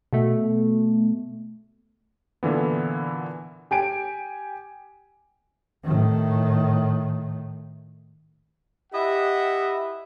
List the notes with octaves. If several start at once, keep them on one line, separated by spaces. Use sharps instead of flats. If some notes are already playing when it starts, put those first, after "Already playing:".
B2 A3
A#2 D3 E3 B3
G4 G#5 D7
A2 D#3
E4 G4 D#5 E5 F#5